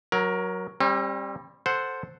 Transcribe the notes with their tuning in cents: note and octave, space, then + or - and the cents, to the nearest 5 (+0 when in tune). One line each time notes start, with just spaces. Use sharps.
F#3 +0 A#4 +20
G3 +15 C4 +45
A4 +0 C5 +0 F#5 +0